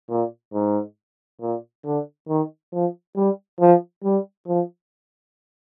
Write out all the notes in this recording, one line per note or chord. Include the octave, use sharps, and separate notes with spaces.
A#2
G#2
A#2
D3
D#3
F3
G3
F3
G3
F3